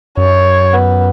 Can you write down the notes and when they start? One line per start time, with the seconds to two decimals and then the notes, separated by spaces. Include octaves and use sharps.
0.17 F#2 C#5
0.74 B3